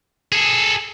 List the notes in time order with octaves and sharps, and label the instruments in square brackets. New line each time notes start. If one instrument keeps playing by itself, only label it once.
[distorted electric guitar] G#4 A4